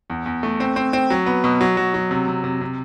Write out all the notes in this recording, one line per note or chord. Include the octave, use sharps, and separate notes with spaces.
E2
E2
A3
C4
C4
C4
F#3
B3
B2
F#3
F#3
F#3
C3
C3
C3
C3